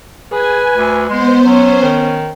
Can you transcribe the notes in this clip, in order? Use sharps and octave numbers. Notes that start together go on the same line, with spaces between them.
G#4 B4 G#5
D2
G#3 B3 C5 C6
F#3 C#4
D#3